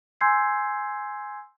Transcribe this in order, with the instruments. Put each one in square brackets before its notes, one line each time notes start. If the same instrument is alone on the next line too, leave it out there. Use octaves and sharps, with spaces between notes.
[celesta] G#5 C6 E6 G6 G#6 C7